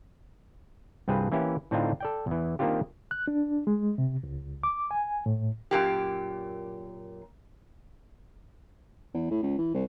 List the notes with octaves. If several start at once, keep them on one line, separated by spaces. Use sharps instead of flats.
C2 G2 C4 F4 G#4 B4
E3 A#3 C#4 E4 G4
A2 D3 C4 D4 D#4 F4
A4 D5 G5
E2 E3
D#3 A#3 C4 D4 F4 G4
F#6
D4
G#3
C3
C#2
D6
G#5
A2
F#2 A#2 G4
E2
A2
C#2
E3
C2